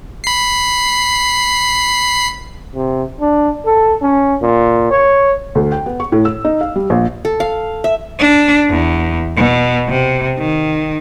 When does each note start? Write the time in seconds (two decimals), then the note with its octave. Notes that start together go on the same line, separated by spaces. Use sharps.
0.24 B5 C7
2.75 C3
3.20 D4
3.65 A4
4.02 C#4
4.42 A#2
4.91 C#5
5.55 D2
5.72 G5
5.86 B3
6.00 C#6
6.12 A2
6.25 E6
6.45 D#4
6.61 F5
6.76 G3
6.90 A#1
7.25 A4
7.40 F5
7.84 E5
8.19 D4
8.70 E2
9.36 B2
9.88 C3
10.38 D#3